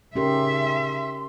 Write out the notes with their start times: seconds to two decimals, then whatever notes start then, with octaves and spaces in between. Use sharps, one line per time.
0.16 C#3 C#4 D#4 G4 A#4 E5 C6